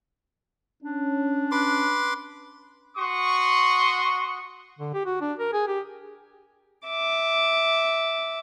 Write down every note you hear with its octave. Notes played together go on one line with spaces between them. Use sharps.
C#4 D4
B4 C6 D6
F#4 C6 C#6 D#6
D3
G4
F#4
D4
A#4
G#4
G4
E5 D6